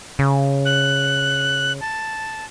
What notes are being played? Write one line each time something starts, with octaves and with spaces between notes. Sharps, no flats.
C#3
F#6
A5